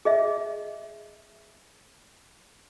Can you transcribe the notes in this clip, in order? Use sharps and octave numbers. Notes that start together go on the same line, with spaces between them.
G#4 D#5 E5